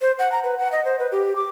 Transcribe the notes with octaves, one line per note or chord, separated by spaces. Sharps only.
C5
F#5
A#5
B4
F#5
D#5
C5
B4
G4
D6